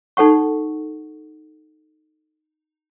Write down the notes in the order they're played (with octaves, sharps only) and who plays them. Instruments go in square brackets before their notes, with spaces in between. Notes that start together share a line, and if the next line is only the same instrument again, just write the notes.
[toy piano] D#4 A4 F#5 C#6